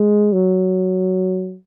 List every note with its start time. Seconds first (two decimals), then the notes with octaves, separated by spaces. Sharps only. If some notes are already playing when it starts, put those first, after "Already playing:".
Already playing: G#3
0.32 F#3